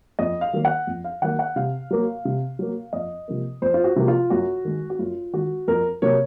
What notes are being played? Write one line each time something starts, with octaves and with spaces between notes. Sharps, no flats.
F2 D#5
F5
D#3 F#3 A#3
F#5
F2
F5
D#3 F#3 A#3 F#5
F#5
C3 F5
F#3 A#3
C3
F#3 A#3
F2 D#5
C3 F3 A#3
F2 C5
F4
F#4
C3 F3 A#3
F4
F#2 F#4
D#3 G#3
F#4
F#2 F4
D#3 G#3 F#4
F2 A#4
C3 F#3 A#3 C#5